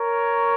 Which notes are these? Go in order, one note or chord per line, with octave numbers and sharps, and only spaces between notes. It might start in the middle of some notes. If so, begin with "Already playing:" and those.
Already playing: A#4 C#5